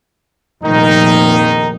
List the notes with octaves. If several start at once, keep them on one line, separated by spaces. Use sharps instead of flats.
F1 A#1 D#3 D#4